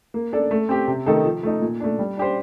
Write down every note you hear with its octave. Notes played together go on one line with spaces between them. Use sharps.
A#3
D4 A4 D5
A3
C4 G4
C3
D#3 A3 D#4 A4
F3
A3 D#4
A#2
A3 D4
G3
D4 G4 C5